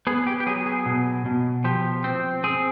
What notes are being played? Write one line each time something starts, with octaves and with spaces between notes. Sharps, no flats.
B3 G#4
G4
G4
F#3 G#4
G#4
B2
B2
F3 G4
C4
C4 G#4